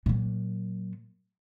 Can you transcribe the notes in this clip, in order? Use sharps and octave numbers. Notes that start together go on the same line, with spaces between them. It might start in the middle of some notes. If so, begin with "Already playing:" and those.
A#2 F#3